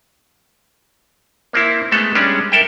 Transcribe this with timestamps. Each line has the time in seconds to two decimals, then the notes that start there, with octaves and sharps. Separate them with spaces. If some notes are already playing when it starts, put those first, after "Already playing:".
1.53 A#3 C4 E4
1.92 G#3 A3 B3 A4
2.15 G3 G#3 C#4 D4
2.52 A4 A#4 E5 G5